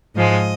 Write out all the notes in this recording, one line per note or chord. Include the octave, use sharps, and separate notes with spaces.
G#2 F3 G#3 D#5